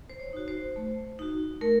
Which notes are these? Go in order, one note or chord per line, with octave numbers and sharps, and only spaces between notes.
C5
C#5
D#4 F#4
C5
A3
D#4 F#4
A3 A#4